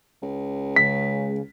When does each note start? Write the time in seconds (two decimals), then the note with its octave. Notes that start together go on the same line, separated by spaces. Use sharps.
0.22 C#2
0.76 C#3 G#3 B6